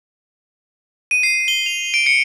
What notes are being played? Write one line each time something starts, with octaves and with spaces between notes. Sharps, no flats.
D#7
C7
G7
F7
D7
C#7